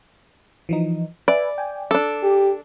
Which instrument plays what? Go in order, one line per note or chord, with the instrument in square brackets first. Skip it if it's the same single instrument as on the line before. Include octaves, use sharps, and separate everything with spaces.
[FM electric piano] E3 F3 D#4
[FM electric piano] B4 E5 G#5 [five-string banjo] D5
[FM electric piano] G5 G#5
[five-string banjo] D4 A4 [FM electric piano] D6
[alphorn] G4